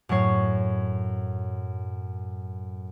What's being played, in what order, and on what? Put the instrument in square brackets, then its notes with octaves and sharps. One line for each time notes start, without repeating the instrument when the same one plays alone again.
[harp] F#2 A2 F#3 C#5 C7